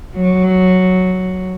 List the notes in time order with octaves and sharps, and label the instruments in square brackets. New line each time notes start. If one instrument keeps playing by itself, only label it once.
[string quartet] F#3